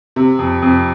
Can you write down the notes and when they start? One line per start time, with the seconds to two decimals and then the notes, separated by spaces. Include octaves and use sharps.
0.16 C3
0.39 F2
0.62 F2